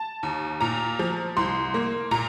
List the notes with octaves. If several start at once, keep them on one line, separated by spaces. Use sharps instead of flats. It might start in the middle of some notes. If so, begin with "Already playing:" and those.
Already playing: A5
D#2
A#2 A#5
F3
C2 C6
A#3
A#2 A#5